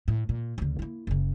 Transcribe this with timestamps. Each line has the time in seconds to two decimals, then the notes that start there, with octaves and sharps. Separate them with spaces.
0.08 A2
0.29 A#2
0.58 D2 C#3
0.79 A#3 E4
1.07 F#1 C#3